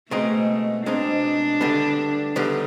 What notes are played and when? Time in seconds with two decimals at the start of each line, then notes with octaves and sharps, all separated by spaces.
0.11 B2 G#3 A3 C4 D#4
0.86 B2 G#3 C4 D4 D#4
1.61 D2 D3 G3 B3
2.36 D2 D3 G3 B3 D#4